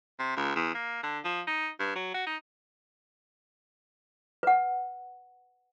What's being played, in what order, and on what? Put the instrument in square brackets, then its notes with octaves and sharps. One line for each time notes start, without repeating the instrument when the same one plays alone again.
[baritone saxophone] C3
C#2
E2
A#3
D3
F3
D#4
G2
F#3
F#4
D#4
[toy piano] B4 F#5